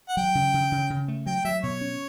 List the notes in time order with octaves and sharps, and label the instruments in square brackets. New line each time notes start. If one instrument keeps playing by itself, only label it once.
[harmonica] F#5
[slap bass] F#3 [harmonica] G5
[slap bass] C#3
C#3
C#3
C#3
A3
[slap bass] F#3 [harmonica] G5
[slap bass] F#3 [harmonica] E5
[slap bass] B2 [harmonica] C#5
[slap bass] C#4